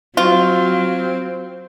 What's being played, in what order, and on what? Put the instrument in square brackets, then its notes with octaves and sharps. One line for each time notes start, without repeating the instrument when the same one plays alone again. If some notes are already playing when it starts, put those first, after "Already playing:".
[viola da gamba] F#3 [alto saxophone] C4 [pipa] F4